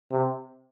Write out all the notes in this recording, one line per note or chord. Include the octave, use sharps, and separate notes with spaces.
C3